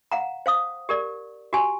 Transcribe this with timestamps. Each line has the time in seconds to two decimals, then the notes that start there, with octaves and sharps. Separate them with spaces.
0.12 F5 F#5 A#5
0.46 C5 F5 D#6
0.89 G4 A#4 D5
1.53 F#4 G4 G#5